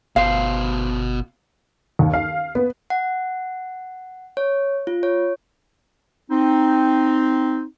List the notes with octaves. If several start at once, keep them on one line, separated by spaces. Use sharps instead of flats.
G1 B2 C5 F5
D#2
F5
B3
F#5
C#5
F4
C#5
C4 D#4